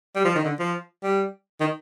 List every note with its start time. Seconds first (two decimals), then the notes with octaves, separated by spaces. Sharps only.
0.16 G3
0.25 F3
0.35 D#3
0.44 D3
0.59 F3
1.03 G3
1.60 D#3